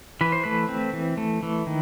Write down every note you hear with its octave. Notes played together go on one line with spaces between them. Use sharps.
E3 B4
C5
A3 B4
C4
E3
A3
E3
D#3